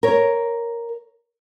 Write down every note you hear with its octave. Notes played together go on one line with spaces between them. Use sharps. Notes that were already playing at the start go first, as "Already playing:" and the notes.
A#4 C#5